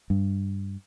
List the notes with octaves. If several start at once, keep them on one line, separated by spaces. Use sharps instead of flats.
G2